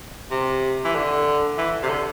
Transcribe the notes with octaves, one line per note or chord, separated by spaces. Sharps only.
C3
E3
D3
E3
C3
D3